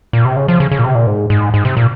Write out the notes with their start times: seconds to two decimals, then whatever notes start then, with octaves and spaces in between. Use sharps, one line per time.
0.13 A#2
0.25 C3
0.36 C#3
0.48 F3
0.60 C#3
0.72 C#3
0.79 A#2
0.84 C3
0.95 A#2
1.07 G#2
1.30 G#2
1.54 G#2
1.65 C3
1.77 A#2